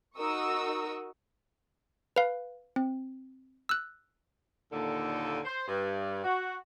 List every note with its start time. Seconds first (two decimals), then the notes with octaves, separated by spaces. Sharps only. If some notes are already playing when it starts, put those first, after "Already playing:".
0.18 D#4 F#4 A#4 C#6 D#6 E6
2.16 B4 F5
2.76 C4
3.69 E6 F#6
4.71 D#2 A#2 D3 A4
5.45 C5
5.68 G2
6.24 F#4